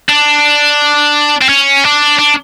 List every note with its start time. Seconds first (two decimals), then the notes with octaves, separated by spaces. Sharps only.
0.09 D4
1.42 C4
1.49 C#4
1.84 D4
2.19 D4